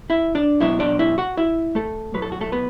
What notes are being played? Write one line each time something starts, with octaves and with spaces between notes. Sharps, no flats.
E4 E5
D4 D5
B1 B2 F#3 E4 E5
D4 D5
E4 E5
F#4 F#5
E4 E5
A3 A4
B1 A2 F#3 B4
A4
F#4
A3 A4
B3 B4